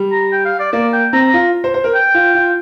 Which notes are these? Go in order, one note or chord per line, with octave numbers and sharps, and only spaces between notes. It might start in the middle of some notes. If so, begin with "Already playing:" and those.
Already playing: G3
A#5
G5
F5
D5
A#3 D5
G5
C4 A#5
F4
C5
C5
A#4
G5
F4
F4